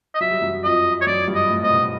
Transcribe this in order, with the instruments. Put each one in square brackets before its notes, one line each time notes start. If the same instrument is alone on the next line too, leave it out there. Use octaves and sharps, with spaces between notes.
[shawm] D#5
[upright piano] F#3 [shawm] E5
[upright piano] G3
F#2 F#3
[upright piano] F2 F3 [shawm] D#5
[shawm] C#5
[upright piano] F#2 F#3 [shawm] D5
[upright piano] G2 G3
[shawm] D#5
[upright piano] A2 A3
[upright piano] C4 [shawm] D#5
[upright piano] B2 B3